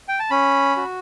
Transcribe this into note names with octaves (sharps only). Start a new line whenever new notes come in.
G5
A5
C#4 B5
F#4